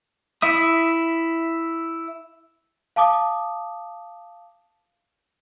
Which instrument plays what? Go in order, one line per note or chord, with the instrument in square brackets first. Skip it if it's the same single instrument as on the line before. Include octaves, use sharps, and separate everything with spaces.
[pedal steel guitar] E4 E5 D#6
[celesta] F5 A5 D6 D#6